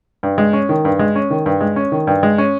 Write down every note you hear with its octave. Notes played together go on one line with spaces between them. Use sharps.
G2
G#3
C#4
D#3
G2
G#3
C#4
D#3
G2
G#3
C#4
D#3
G2
G#3
C#4